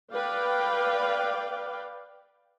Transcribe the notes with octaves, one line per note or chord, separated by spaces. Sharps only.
B4 D5 F5 G5